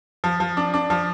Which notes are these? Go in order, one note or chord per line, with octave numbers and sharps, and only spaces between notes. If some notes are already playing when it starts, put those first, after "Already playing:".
F3
F3
D4
D4
F3